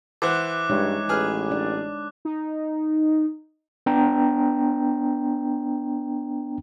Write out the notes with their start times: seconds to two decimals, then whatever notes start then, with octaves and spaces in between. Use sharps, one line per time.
0.22 E3 C5 F#5 D6 F#6
0.70 G2 G#3 D#4 C#5
1.09 A1 G#4 B4 F6
1.51 D4 D5
2.25 D#4
3.86 B3 D4 G5 A#5